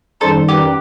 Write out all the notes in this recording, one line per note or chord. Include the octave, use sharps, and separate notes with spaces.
F#2 D#3 G3 D#4 A4 C5
G4 B4